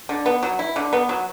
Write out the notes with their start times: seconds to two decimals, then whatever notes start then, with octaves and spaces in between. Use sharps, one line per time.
0.09 D3
0.26 B3
0.43 F#3
0.59 E4
0.76 D3
0.93 B3
1.09 F#3